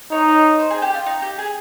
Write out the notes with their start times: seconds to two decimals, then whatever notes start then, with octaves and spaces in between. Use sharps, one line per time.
0.11 D#4 C#5
0.59 C5
0.71 G#4
0.82 G4
0.95 F4
1.06 D#4
1.22 G4
1.39 G#4